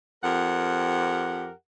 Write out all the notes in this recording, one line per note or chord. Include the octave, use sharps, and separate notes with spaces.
F2 G4 A#4 F#5